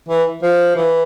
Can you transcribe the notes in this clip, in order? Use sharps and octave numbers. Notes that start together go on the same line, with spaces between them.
E3
F3
E3